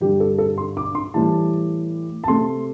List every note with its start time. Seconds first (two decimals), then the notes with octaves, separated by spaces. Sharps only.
0.01 G2 D3 G3 G4
0.20 A4
0.38 A4
0.58 C6
0.77 D6
0.95 C6
1.14 A2 E3 G3 A5
2.24 A5
2.28 C3 A3 C6